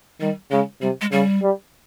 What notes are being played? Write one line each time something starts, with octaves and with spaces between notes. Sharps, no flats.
D#3 G3
C#3 G#3
C3 G3
G#3
C#3 G3
G3